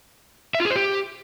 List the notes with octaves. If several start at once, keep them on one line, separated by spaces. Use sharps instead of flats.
E5
F4
G#4
C5
G4